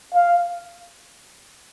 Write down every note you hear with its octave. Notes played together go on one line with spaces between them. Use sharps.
F5